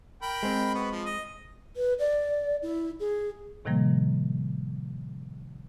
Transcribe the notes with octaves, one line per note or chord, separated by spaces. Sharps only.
A#4 G5 B5
G#3 C4
B3 F#4 B4
F3
D#5
B4
D5
E4
G#4
A2 C3 D#3 F3 G3 A#3